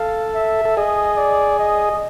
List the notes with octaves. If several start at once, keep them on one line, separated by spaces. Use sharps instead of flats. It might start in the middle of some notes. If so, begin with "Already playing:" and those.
Already playing: A4 F5
E5
A4
G#4 D#5
D5
D#5